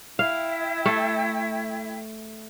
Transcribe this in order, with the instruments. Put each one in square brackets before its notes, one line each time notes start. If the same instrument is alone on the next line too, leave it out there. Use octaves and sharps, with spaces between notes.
[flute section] E4 E5 G5 [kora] F5
[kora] A3